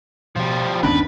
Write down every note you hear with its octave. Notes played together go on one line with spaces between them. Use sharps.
B2 F3 G3
G1 D#2 D#3 B3 C#4 D4 B4